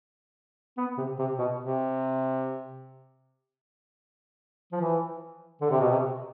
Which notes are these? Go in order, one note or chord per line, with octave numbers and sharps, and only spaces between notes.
B3
C3
C3
B2
C3
F3
E3
D3
C3
B2
C3